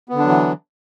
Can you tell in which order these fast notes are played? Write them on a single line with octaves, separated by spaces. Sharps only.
B3 D3 D4 F#3 E3